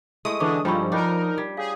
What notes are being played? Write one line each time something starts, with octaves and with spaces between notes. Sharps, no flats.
G#3 A3 E4 A#4 C#6 D#6
D3 E3 C#4 D4 E4 A4 D6
G2 F3 C#4 D#4 G5 B5 E6
D4 D#4 F4 A#4 C#5 G5
G3 D5
G#4 C#5 F5